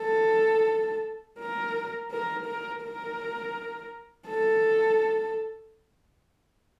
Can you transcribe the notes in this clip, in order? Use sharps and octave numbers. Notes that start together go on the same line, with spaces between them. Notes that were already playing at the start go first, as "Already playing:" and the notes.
Already playing: A4
A#4
A#4
A#4
A#4
A4